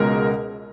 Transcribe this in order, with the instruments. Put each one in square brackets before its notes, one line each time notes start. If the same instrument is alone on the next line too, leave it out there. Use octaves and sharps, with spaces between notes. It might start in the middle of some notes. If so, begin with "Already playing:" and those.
Already playing: [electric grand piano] C#2 B2 G#3 A#4